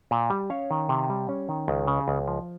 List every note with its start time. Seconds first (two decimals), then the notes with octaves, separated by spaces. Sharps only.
0.11 A#2
0.30 G3
0.50 C#4 C#5 F5
0.71 D#3
0.89 C3
1.09 G3
1.29 C#4
1.49 D#3
1.68 C#2
1.87 C#3
2.08 C#2
2.28 F3